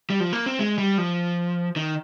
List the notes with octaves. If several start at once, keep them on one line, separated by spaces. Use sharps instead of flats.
G3
F3
A#3
C4
G#3
G3
F3
D#3